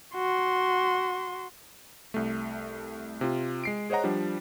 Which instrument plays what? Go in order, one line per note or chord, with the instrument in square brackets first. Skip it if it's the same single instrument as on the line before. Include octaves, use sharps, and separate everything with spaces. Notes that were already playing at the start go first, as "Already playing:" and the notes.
[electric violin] F#4 C6
[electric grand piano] C2 A3
C3 F4
G#3 C7 D7
G#4 C5 C#5 D#5 F#5 A#5
F3 G3 D4